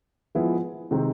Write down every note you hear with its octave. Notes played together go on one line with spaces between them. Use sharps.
F3 G#3 B3 E4 G#4
C3 D#3 G#3 C4